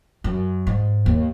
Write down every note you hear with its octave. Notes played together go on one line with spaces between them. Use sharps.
F#2
G#2
D#2